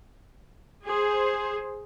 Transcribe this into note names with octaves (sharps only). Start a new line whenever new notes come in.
G#4 C5